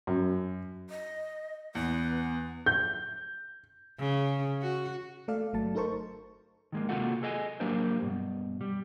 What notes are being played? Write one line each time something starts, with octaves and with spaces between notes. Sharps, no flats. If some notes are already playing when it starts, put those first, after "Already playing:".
F#2
D#5
E2 B3
G6
C#3
F#4
A3 A4 D5 F5
G1 F#3 A3 A5
D#4 A4 A#4 C5 A5 C#6
D#3 G#3 A#3
C3 A#3 F4 F#4 A4 F#5
G#4 A4 D#5 F#5 G#5
F#3 A#3 D4 G4 A#4 C5
G2 B2
G3